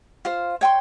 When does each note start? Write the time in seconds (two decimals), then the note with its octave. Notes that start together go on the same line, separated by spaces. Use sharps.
0.25 F4 C5 F5
0.61 C#5 G5 C6